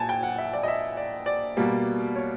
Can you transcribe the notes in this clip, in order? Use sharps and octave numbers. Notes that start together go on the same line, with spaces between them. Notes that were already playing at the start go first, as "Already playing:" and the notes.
Already playing: A#2 G#5 A5
G5
F#5
E5
D5
D#5
E5
D5
D5
B2 G3 A#3
C#5